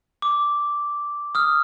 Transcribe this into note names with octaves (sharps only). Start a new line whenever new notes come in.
D6
D#6 F6